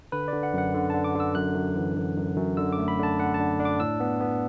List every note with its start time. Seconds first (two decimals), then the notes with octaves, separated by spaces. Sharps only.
0.12 D3 B4
0.28 D3 D5
0.43 F#5
0.53 F#2 F#5
0.75 D3
0.90 D3 A5
1.04 D6
1.15 D3 E6
1.35 F#2 F#6
1.56 F#2
1.76 E3
1.97 F#2
2.18 F#2
2.37 F#2
2.57 D3 E6
2.72 D6
2.79 A3
2.88 B5
2.99 D3 A5
3.19 D3 F#5
3.34 A5
3.40 D4
3.60 D4
3.65 D6
3.80 A2 E6
4.00 B3
4.21 B3